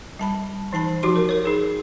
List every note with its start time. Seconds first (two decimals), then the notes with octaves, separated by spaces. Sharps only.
0.19 G3 A5 B5
0.73 E3 D#4 A5 B5
1.03 F3 D#4 F#4 G4 C6 D6
1.16 A#4
1.29 A#4 C#5
1.44 D#4 G#4 C#5